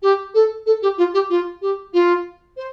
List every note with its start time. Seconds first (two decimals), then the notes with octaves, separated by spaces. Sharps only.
0.02 G4
0.34 A4
0.66 A4
0.82 G4
0.98 F4
1.14 G4
1.29 F4
1.62 G4
1.93 F4
2.57 C5